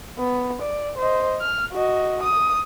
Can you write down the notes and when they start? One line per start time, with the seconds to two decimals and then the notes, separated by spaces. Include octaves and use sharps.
0.19 B3
0.62 D5
0.98 C5 D#5
1.41 F6
1.73 F#4 D#5
2.22 D#6